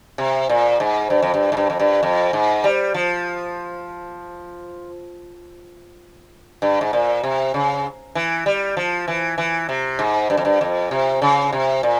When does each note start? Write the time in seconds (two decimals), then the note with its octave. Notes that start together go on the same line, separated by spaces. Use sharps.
0.18 C3
0.50 A#2
0.80 G#2
1.10 G2
1.22 F2
1.34 G2
1.52 G#2
1.57 G2
1.70 F2
1.80 G2
2.03 F2
2.33 G#2
2.64 G3
2.94 F3
6.62 G2
6.81 G#2
6.93 A#2
7.23 C3
7.54 C#3
8.15 E3
8.46 G3
8.77 F3
9.08 E3
9.38 E3
9.69 C3
9.99 G#2
10.30 G2
10.37 F2
10.45 G2
10.61 F2
10.91 C3
11.22 C#3
11.53 C3
11.83 A#2